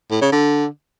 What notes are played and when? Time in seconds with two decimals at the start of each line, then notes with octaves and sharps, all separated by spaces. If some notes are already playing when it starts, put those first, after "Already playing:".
0.11 A2
0.22 C#3
0.32 D3